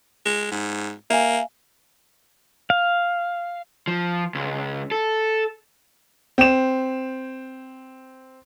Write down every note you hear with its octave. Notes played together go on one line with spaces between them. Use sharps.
G#3
G#2
A#3 E5 F5 G#5
F5
F3
C#2
A4
C4 E7